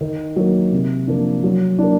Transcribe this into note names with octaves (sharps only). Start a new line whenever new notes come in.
D#3
F#3 A#3
C3
F3 A#3 D4
F#3
A#3 D4